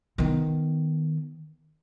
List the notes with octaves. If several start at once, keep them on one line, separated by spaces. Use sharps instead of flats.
D#3 B3